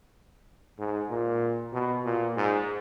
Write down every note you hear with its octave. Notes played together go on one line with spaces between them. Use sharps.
G#2
A#2
B2
A#2
G#2